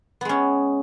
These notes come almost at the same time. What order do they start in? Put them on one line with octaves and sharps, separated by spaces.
B3 G#3 C#4